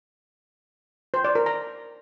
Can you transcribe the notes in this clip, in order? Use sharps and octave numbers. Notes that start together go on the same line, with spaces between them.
C5
D5
A#4
A#5